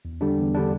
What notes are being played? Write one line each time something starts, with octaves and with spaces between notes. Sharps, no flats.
E2
D3 G3 D4
E2
D3 G3 D4